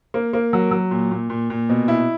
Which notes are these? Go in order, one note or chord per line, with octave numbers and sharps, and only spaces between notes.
A#3
A#3
F#3
F#3
A#2
A#2
A#2
A#2
B2
E4